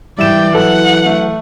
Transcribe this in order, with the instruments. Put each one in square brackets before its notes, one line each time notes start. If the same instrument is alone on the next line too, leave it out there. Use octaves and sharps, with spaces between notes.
[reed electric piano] G#2 G3 [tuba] E3 [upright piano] E4 E7 [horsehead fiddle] D5 G5
[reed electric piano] F#3 A4 B4 [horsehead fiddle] F#5
[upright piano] A3